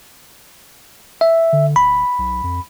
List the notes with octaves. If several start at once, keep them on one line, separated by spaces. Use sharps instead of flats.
E5
D3
D1 B5
B1
F2